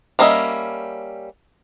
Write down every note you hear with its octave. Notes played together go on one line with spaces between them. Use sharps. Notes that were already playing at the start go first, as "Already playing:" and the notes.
G3 A#3 C#4 D#5 E5